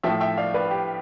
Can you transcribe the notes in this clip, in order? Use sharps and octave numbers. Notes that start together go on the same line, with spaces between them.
A2 F3 E5 G5
E5 G5
D5 F5
B4 D5
G4